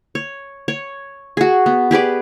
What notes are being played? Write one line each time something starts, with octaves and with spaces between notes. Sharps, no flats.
C#5
C#5
F#4 G#4
B3
G4 G#4 B4 D5